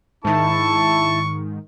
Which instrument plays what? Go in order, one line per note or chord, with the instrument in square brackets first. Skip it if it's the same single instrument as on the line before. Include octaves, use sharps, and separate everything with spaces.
[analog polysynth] G#2 D#3 [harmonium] E4 A5 [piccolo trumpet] C#6